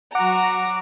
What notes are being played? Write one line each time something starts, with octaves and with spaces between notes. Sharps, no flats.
F#3 F#4 F#5 A#5 D6